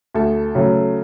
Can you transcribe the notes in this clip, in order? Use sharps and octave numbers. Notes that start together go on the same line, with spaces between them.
D2 A4
C#3 F#3 A3